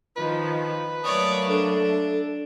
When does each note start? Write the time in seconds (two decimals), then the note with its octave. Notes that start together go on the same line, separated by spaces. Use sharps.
0.17 D#3 F3 D#4 B4
1.04 F#3 A3 A#3 C#5 D5 D#6
1.48 D4 A4